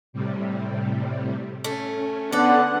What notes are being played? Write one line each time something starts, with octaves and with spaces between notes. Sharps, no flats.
A2 C3 G3
A3 C#4
D3 B3 A4 D5 F#5